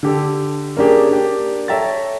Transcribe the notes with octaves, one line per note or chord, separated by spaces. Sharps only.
D3 G4 A4
A#3 C#4 D4 G4 G#4
A#3 D4 G4
A4 C#5 E5 G5 A#5 A6